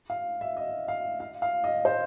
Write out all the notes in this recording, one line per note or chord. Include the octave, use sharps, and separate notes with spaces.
F5
E5
D#5
F5
F5
F5
D#5
C5